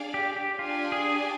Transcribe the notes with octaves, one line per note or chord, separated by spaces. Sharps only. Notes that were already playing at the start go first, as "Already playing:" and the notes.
Already playing: D4 G#4 D5 F5
G4
G4
D4 F4 G4 D5 G#5
G#4